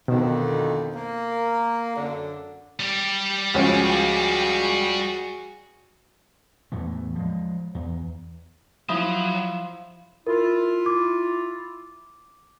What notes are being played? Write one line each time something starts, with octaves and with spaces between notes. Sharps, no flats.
F2 B2 D3 D#3
A#3
F#2 D3
G3 G4
C#2 F3 C#4 F#4 G#4
E2 A2 E3 A3
F3 G#3
E2
F3 F#3 E4 E5 B5 D#6
E4 F4 A#4
D6